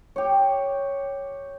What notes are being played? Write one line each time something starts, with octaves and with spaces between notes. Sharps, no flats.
G4 C#5